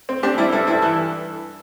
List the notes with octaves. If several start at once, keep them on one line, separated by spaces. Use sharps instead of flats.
C4
C4 D4 G4
G3 E4
G2 E4 A4
G2 E4 A4
E3 E4